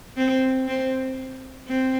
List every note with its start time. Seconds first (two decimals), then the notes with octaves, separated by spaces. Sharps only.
0.17 C4
0.68 C4
1.68 C4